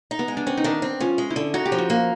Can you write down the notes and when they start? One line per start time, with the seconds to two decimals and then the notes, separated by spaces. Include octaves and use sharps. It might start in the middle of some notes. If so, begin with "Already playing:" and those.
0.11 D#4
0.19 B3
0.28 G#3
0.37 D4
0.47 C4 C#4
0.57 D#4
0.64 D#3 D4
0.82 C4
1.00 F3 C#4
1.18 G#3
1.30 E4
1.36 D3
1.54 D#4 F#4
1.65 G4
1.72 F3
1.78 F#4
1.90 A#3